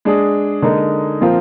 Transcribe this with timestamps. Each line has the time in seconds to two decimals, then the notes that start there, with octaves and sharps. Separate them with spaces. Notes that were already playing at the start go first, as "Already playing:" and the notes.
0.05 G#3 D4 G#4
0.62 D3 G#3 D#4 A#4
1.20 A#2 F3 C4 F4 A#4